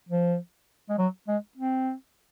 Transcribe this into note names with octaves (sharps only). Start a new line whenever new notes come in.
F3
G#3
F#3
G#3
C4